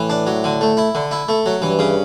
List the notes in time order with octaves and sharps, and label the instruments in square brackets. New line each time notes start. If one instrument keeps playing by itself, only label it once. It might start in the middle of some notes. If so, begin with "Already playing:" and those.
Already playing: [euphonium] A2 [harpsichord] E3
[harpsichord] D4
F#3
D3
A3
E4
D3
E4
A3
F#3
[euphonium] G2 [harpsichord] E3
[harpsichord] C#3